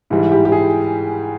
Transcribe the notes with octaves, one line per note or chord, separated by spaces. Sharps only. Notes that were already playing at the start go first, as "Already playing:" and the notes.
G#2 E3 G3 E4
G4
G4
G#4